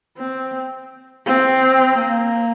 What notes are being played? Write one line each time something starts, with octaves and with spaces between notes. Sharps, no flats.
C4
C4
A#3